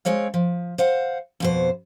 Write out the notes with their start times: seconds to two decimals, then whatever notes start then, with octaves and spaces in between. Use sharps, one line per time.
0.05 G#3 C4 C#5 F5
0.34 F3
0.78 C5 F5 F#5
1.40 F2 B2 C5